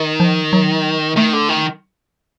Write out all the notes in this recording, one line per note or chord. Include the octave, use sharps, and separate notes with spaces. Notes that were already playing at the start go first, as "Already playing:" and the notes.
Already playing: D#3
F3
F#3
D#3 A3
D3
D#3